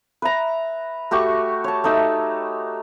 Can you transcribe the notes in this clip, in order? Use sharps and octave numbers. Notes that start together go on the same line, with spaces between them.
B4 E5 A#5
A3 F#4 G4 C#6
C#5 A5
A3 D#4 E6